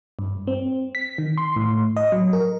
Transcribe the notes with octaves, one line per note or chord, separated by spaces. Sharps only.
G2
C4
B6
D#3
C6
A2
D#5
F#3
A#4